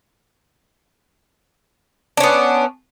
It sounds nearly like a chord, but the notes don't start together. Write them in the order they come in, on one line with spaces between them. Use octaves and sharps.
D4 C#4 B3